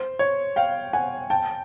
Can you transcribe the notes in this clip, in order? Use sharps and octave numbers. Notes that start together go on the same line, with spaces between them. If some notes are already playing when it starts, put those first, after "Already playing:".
Already playing: C5
C#5
F5 G5
F#5 G#5
G5 A5